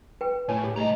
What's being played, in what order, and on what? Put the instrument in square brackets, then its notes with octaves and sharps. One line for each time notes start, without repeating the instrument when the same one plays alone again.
[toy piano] B4 G5
[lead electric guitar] A2 [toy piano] C#5 [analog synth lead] G#5
[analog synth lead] G4
[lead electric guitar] C2 A#5 [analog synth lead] G#2 [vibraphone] A3 D#5